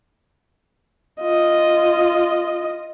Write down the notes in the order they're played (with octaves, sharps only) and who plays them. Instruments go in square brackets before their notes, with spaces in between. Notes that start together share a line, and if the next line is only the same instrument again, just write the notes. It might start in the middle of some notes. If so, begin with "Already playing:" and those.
[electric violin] F4 D#5